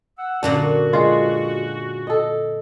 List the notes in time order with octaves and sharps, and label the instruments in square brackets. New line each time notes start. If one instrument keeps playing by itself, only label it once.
[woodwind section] F#5 E6
[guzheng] F#2 A#2 D3 [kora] D4 [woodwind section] F#4
[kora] G#3 F4
A4 D#5